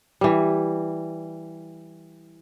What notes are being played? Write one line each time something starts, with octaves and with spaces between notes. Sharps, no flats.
E3 G3